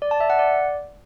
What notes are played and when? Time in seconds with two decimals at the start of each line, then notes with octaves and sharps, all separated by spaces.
0.02 D5
0.11 A5
0.20 E5
0.30 F#5
0.39 D5